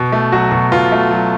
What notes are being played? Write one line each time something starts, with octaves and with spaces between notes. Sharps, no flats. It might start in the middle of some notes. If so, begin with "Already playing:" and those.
Already playing: B2
A3
F#3 F#4
B2
B2 F4
A3
F#3